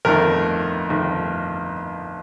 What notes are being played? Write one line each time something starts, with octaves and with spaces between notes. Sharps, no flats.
G1 F2 D#3 A3 A#4
G1 F2 D#3 A3